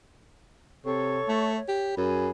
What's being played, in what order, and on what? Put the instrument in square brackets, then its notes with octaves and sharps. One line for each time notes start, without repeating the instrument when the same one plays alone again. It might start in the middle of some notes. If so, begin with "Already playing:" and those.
[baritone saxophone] C3 [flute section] A4 C#5 C#6
[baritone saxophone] A3
[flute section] C#5
[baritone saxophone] G4
[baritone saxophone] F#2 [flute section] G#4 G#5 B5